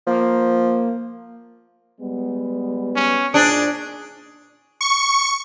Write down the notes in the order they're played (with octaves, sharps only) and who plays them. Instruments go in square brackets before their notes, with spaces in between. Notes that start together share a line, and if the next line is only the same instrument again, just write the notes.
[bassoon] F3 [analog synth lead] A#3
[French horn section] G3 G#3 B3
[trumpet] C#4
[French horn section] A#2 D#4 C5 [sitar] D4 [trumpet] G#4
[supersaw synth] C#6